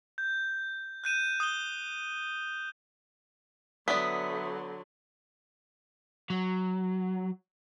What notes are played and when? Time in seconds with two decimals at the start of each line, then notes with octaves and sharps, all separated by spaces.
0.18 G6
1.04 F#6 G6 D#7 E7
1.40 D#6 G7
3.88 D3 F#3 B3 D5 E5 D#6 B6
6.30 F#3